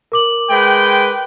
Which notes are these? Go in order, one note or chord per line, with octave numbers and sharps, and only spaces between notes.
A#4 D6 F#7
G#3 B4 G5